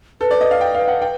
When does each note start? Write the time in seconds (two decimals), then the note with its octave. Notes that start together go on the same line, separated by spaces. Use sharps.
0.21 A4 B4
0.31 D5
0.41 D#5
0.51 F5
0.61 G5
0.75 F5
0.88 F#5
1.02 G5